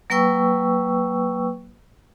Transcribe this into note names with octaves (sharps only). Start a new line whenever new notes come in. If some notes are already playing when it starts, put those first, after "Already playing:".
F#3 A#3 B4 G5 C#6 E6